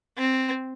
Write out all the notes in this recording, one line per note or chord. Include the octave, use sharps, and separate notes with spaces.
C4